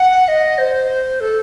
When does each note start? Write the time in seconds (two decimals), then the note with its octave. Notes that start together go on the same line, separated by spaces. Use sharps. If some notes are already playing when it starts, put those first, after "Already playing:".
Already playing: F#5
0.28 D#5
0.58 C5
1.21 A4